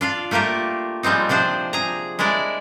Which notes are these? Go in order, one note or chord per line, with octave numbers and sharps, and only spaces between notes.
D4 F4 F5
A3 A#3 F4 G4 A#4
F3 G3 G#3 C4 D#4
C3 F3 D4 C5
G#4 A#5
G#3 D4 E4 A#4 D5